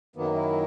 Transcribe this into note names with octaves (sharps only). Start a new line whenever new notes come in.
F#2 D#3 F#3 A#3 B3
E4